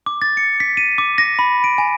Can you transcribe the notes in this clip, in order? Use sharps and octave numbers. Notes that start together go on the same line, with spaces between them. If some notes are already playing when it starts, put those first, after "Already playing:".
D6
A6
C#7
B6
D#7
D6
A#6
B5
D7
G#5